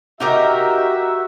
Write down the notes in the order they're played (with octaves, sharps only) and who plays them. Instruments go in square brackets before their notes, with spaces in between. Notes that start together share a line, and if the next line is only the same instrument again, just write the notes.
[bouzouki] D#4 G4 A#4 [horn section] F#4 E5